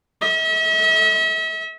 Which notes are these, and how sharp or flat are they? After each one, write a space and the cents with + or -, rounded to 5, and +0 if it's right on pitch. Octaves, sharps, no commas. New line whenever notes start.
E5 -40